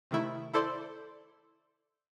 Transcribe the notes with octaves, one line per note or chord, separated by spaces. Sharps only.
C3 D#3 A3 E4
E4 A4 C5 D5 C6